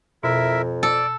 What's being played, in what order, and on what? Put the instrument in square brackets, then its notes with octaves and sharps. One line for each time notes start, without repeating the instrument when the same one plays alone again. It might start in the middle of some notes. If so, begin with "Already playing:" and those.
[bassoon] F2 [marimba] B2 [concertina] E4 A#4 E5
[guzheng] A4 [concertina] D5